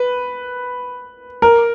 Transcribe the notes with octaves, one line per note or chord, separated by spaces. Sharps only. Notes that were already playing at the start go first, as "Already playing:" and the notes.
Already playing: B4
A#4